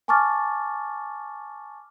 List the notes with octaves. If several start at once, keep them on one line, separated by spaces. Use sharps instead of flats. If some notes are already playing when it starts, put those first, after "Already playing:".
G#5 A5 C#6 D6 F6 A6